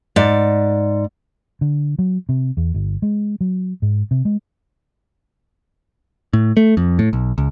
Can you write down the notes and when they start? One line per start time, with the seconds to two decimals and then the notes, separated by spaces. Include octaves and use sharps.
0.16 G#2 D5
1.61 D3
1.99 F#3
2.29 C3
2.57 E2
2.74 G1
3.02 G#3
3.41 F#3
3.82 G#2
4.11 C3
4.25 G#3
6.33 A2
6.57 A3
6.77 F2
6.99 A2
7.13 B1
7.38 C#2